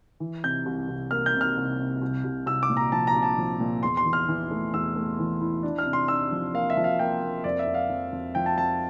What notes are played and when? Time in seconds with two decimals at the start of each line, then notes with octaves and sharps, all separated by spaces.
0.20 E3
0.44 C3 G6
0.66 C2
0.89 C2
1.11 A#3 F6
1.26 G6
1.35 C3
1.41 F6
1.57 C2
1.79 C3
2.02 C2
2.24 C2
2.46 C2 E6
2.63 D6
2.70 A#2
2.77 A#5
2.92 F3 A5
3.07 A#5
3.15 C2
3.23 A5
3.38 F3
3.60 A#2
3.83 E2 C6
3.97 C6
4.05 E3
4.13 F6
4.29 E3
4.51 A3
4.74 E2 E6
4.96 A3
5.19 E3
5.41 E4
5.63 D4
5.78 F6
5.86 C3
5.93 C6
6.08 D4 E6
6.32 F3
6.54 A#3 F5
6.70 E5
6.77 F3
6.84 F5
6.99 A#3 G5
7.22 A#3
7.44 F2 D5
7.59 E5
7.67 F2
7.74 F5
7.89 F2
8.12 F2
8.35 F3 G5
8.46 A5
8.58 F2 A5